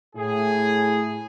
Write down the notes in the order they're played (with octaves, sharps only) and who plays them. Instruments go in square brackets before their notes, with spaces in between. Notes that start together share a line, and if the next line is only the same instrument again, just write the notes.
[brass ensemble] A2 G#4